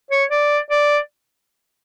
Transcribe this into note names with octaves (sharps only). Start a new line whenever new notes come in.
C#5
D5
D5